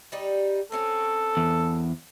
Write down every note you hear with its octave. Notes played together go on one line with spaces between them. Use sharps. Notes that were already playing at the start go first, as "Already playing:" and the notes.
G3 D#4 G4
C4 C#4 F#4 A4
E2